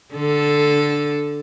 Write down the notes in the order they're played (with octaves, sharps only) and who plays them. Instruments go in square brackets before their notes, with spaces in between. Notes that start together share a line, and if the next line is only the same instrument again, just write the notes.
[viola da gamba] D3 A4